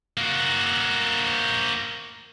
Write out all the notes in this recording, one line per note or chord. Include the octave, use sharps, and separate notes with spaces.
A#3 F#4